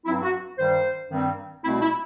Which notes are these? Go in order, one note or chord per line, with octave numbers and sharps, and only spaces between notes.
G2 F#3 C4 E4
F#4
G2 D#3 G3 C5
G2 D#3 G3 C4
C2 B2 A3 C4 E4
E4